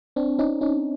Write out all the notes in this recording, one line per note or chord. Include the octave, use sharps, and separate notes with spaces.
C4 D4
C#4 D#4
C#4 D#4